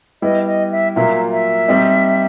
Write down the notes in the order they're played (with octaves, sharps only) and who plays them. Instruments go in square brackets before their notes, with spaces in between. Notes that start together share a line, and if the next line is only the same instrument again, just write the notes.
[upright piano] G3 B3 E4 [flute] D#5
[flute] D#5
E5
[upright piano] A#2 F#3 A#3 [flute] E5
[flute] E5
[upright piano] G3 C4 D#4